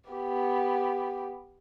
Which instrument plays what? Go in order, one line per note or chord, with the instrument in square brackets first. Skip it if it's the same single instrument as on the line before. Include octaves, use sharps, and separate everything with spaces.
[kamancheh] B3 G4